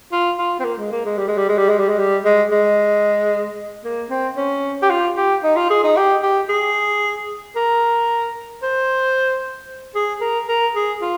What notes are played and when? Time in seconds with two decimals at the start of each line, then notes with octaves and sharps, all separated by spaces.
0.12 F4
0.38 F4
0.60 C4
0.64 A#3
0.78 G#3
0.92 A#3
1.05 G#3
1.18 G3
1.28 G#3
1.37 G3
1.49 G#3
1.58 G3
1.69 G#3
1.79 G3
1.88 G#3
1.99 G3
2.24 G#3
2.51 G#3
3.84 A#3
4.10 C4
4.37 C#4
4.82 G4
4.90 F4
5.17 G4
5.43 D#4
5.56 F4
5.70 G#4
5.84 D#4
5.96 G4
6.23 G4
6.49 G#4
7.56 A#4
8.63 C5
9.95 G#4
10.21 A#4
10.48 A#4
10.75 G#4
11.01 F4